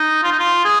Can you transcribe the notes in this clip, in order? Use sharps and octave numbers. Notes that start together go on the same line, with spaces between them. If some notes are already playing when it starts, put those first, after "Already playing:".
Already playing: D#4
F4
D#4
F4
G#4